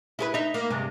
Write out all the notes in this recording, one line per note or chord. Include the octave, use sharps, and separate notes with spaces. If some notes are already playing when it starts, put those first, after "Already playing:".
E4 G#4 B4
D#4 E5
A#3
G2 C3 G#3